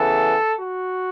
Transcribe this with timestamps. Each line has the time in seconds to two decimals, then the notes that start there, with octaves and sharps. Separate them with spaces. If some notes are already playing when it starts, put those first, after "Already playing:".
Already playing: C#3 E3 B3 A4
0.60 F#4